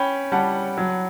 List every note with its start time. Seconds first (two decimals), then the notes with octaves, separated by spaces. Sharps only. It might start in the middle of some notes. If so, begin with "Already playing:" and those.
Already playing: C#4 G5 B5
0.32 G3 F#5 A5
0.78 F#3